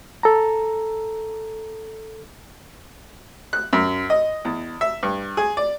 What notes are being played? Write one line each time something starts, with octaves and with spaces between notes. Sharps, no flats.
A4 A#5
F#6
F#2
D#5
E2
E5
G2
G#4
D5